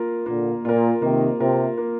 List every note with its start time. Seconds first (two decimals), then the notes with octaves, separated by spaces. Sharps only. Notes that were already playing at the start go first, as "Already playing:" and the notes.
Already playing: A#3 F4 A#4
0.26 A#2 D3 A#3
0.65 A#2 F4 A#4
1.02 C3 D#3 A#3
1.39 C3 F4 A#4
1.78 A#3